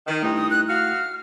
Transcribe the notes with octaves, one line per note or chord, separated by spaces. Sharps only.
D#3
G2 A3 D#4 E4 G5
D#6
F#6
F#4 F5 F6